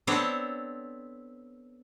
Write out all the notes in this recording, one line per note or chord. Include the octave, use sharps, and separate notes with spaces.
B3 C4 D4 A4 C#5